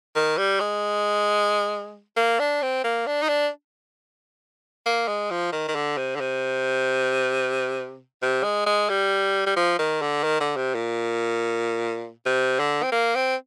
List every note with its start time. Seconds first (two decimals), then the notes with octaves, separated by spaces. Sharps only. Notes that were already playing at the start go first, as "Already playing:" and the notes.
0.15 D#3
0.38 G3
0.60 G#3
2.16 A#3
2.39 D4
2.62 C4
2.84 A#3
3.07 D4
3.22 D#4
3.28 D4
4.86 A#3
5.08 G#3
5.30 F3
5.52 D#3
5.68 D#3
5.75 D3
5.97 C3
6.16 D3
6.21 C3
8.22 C3
8.44 G#3
8.66 G#3
8.89 G3
9.46 G3
9.56 F3
9.79 D#3
10.02 D3
10.23 D#3
10.40 D3
10.56 C3
10.74 A#2
12.26 C3
12.59 D3
12.83 C4
12.92 A#3
13.15 C4